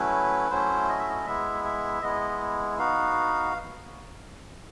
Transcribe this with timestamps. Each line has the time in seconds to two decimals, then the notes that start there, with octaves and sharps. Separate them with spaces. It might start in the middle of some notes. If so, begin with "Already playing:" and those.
Already playing: F#3 A3 C#4 E4 B4
0.50 F#3 A3 C#4 E4 C5
0.89 D#5
0.99 E5
1.09 D#5
1.26 G#3 B3 E4 E5
1.65 E5
2.02 G#3 B3 E4 D#5
2.79 B3 D#4 F#4 F5